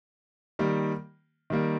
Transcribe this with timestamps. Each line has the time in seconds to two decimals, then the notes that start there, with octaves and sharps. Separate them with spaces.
0.59 D#3 G3 A#3
1.50 D#3 G3 A#3